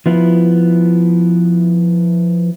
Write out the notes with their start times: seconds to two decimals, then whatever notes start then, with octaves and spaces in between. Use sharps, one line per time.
0.06 F3 B3 E4